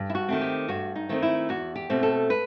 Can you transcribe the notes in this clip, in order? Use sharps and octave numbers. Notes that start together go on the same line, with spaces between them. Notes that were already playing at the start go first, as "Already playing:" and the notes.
Already playing: G2
E4
F#4
D#3 A3 C4
G4
G2 F#4
D#4
D#3 A3 C4 D#4
E4
E2 F#4
G4
B2 A3 C4
A4
B4